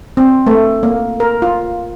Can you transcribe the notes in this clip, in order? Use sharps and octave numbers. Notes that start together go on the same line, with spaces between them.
C4
A3
A#3
A#4
F4